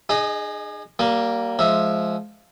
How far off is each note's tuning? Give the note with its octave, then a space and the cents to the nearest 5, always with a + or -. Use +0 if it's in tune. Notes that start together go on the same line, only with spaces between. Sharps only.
D#4 -45 G#4 +0 D#5 +0
G3 -30 A#3 +0 D6 +0
F3 +0 G#3 +20 E5 +0